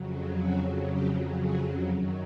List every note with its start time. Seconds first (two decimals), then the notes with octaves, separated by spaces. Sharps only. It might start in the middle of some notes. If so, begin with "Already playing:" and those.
Already playing: F2 C#3 F#3
0.38 F#4
0.89 G4
1.41 G#4
1.91 F#2 D#3 F#3